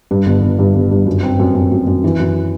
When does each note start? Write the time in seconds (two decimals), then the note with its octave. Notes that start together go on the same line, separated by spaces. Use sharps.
0.11 G2
0.26 G1
0.42 G1
0.59 G2
0.75 G1
0.91 G2
1.06 F#2
1.23 C4
1.40 F#2
1.55 F#2
1.72 F#2
1.87 F#2
2.04 E3
2.20 F#2